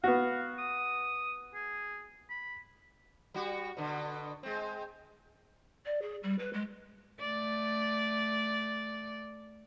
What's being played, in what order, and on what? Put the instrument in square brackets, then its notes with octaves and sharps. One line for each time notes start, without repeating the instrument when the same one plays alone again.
[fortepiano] B3 F#4 [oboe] F5
[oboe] D#6
G#4
B5
[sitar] G3 F#4
B2 D3
G#3 C4
[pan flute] D5
G#4
G3
B4
G#3
[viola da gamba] A3 D5